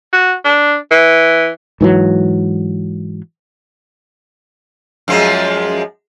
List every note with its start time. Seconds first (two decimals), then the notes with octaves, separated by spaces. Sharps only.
0.13 F#4
0.45 D4
0.91 E3
1.81 G#2 E3 F#3
5.08 F#2 F3 G#3